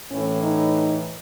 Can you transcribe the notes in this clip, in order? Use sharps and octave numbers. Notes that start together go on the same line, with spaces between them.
A2 E3 C#4
D#4